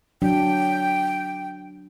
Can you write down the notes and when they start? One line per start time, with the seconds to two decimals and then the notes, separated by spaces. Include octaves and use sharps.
0.22 F#3 D4 G5